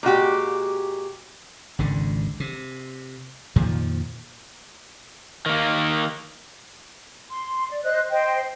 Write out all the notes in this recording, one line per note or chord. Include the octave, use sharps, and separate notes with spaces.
A#2 G#3 F#4 G4
G#1 C#2 D3
C3
F2 A#2 D#3 F3
D#3 A#3
C6
D5
C5 D#5 F#6
C5 D#5 G5